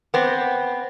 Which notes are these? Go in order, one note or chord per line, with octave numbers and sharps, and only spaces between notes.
B3 C4